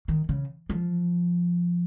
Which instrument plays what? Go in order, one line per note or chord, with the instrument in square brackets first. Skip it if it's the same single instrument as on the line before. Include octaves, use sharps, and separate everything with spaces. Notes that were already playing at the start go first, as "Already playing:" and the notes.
[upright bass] D#3
C#3
F3